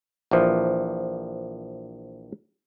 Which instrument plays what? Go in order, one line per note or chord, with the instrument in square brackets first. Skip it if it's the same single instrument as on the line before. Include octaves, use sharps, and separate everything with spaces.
[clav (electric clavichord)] A#1 E3 F3